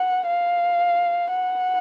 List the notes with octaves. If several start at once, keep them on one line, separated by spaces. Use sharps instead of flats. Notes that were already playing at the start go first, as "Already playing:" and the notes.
Already playing: F#5
F5
F#5